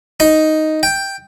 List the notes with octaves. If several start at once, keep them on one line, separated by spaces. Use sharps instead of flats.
D#4
G5